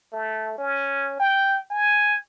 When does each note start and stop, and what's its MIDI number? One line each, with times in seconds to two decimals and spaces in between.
0.12 0.53 57
0.58 1.15 61
1.19 1.61 79
1.70 2.17 80